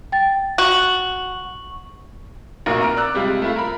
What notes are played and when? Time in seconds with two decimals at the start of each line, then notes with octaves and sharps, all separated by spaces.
0.12 G5 A6
0.58 F#4 C#6 F#7
2.66 F1 A#1 A#3 F4 F#4 A#4
2.82 A#5 F6 D7
2.97 D5 E6 F#6
3.14 C3 G3 G#3 F4
3.42 A3 E4 F4
3.56 A#4 B5